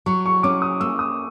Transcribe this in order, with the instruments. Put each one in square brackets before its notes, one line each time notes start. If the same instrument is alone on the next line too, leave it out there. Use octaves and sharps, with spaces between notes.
[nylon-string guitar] F#3 [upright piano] C#6
[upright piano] C#6
[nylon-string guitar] C#4 [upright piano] D6
[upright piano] D#6
[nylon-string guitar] A#3 [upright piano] E6
[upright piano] D#6